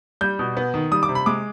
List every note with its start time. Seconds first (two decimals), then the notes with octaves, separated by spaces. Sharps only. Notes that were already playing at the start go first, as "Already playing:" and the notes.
0.21 G3 G6
0.39 B2
0.57 B3
0.74 D#3
0.92 G3 D#6
1.03 D6
1.09 C3
1.15 B5
1.26 G#3 D6